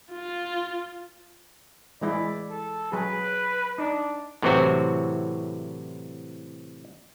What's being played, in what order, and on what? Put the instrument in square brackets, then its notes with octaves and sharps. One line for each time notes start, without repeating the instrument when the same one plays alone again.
[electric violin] F4
[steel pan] E3 G#3 E4 [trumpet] D5
[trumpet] A4
[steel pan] F#3 G#4 [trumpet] B4
[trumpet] D4 [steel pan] D#4
[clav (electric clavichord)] A2 C3 E3 F#3 C4 F#4